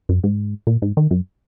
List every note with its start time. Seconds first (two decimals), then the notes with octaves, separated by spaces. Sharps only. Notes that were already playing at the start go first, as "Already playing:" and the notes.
0.09 F#2
0.24 G#2
0.67 A#2
0.82 G#2
0.97 D#3
1.11 F#2